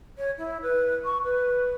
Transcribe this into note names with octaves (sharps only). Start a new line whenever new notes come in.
C#5
E4
B4
C#6
B4